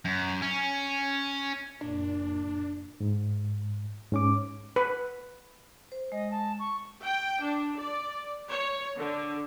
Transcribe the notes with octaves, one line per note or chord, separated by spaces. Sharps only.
F#2
C#4
F#1 A#2 D4
G#2
G#2 C#4 D6
B4
C5
G#3 D#5
A5
C#6
G5
D4
D5
C#5
D3